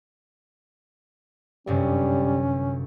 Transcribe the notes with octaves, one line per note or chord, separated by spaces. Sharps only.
G1 F#2 C3 G3 C#4